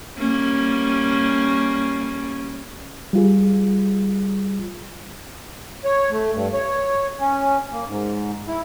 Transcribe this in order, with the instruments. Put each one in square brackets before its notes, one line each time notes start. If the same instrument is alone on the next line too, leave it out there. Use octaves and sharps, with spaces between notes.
[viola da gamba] G3 A#3 C#4
[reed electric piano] G3 F4 G#4
[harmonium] C#5
A3
G2
C#5
C#4
A#3
G#2
E4